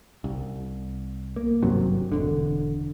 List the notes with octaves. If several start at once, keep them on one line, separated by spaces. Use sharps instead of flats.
C2
A#3
G#1 G2 C3 F#3
E1 B1 D3